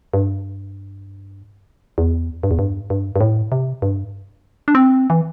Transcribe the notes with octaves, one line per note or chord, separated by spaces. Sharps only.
G2
E2
G2
E2
G2
G2
G2
A2
C3
G2
D4
C4
E3